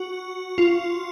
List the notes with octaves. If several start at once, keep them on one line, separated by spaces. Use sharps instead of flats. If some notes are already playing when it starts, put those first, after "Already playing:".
Already playing: F#4
F4